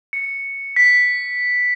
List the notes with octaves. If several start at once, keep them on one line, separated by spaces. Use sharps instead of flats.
C#7
B6